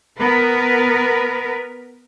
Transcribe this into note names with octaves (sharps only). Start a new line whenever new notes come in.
B3 A#4 B4